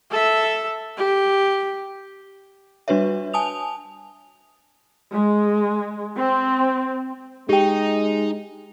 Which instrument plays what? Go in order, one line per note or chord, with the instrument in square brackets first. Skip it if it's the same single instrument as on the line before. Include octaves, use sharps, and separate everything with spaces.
[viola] A4 E5
G4
[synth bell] G3 D4 F#4 B4 C#5 E5
G#5 A5 D#6 F7
[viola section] G#3
C4
[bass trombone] G#3 [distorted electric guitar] D#4 [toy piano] G4 G5